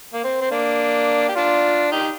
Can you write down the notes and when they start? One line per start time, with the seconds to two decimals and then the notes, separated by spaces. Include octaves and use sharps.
0.13 A#3
0.24 C4
0.41 C4
0.51 A#3 D4
1.28 G4
1.36 D4 F4
1.92 D#4 G4